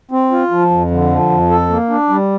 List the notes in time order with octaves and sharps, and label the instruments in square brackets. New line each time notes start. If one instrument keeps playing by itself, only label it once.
[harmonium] C4
F4
F3
F2
D3
F3
F2
A4
A#3
D4
G3